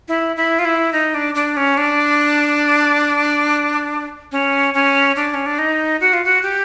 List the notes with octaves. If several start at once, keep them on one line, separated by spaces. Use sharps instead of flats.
E4
E4
F4
E4
D#4
D4
D4
C#4
D4
C#4
C#4
D4
C#4
D4
D#4
F#4
F4
F#4
G4